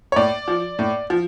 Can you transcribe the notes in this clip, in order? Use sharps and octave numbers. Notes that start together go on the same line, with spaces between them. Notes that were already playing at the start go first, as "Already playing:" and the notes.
C#5
A2 D5
F3
A2
F3